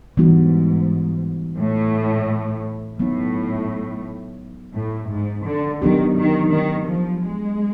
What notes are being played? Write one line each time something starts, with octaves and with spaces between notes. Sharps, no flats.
G#2 E3 G3 B3 D#4 F#4
A2
A2 F#3 B3 D#4
A2
G#2
D3
D#3 F#3 B3 D4 G4
D#3
D#3
F3
G#3